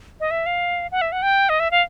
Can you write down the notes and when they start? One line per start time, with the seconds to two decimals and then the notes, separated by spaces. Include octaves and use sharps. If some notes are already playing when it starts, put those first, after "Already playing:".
0.20 D#5
0.31 E5
0.46 F5
0.92 F#5
1.01 E5
1.12 F#5
1.22 G5
1.49 D#5
1.60 E5
1.71 F5